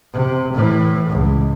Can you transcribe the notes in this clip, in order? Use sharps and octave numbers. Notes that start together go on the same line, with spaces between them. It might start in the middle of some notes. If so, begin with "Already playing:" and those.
C3
A2 E3
C#2